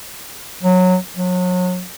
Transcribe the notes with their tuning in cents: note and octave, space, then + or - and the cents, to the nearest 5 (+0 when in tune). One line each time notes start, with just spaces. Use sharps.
F#3 -15
F#3 -35